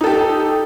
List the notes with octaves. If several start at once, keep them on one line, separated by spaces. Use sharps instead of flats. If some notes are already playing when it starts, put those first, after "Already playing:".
D#4 G4 A4